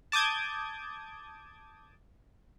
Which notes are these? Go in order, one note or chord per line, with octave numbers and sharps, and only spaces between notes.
A5 D6 D#6 G6 G#6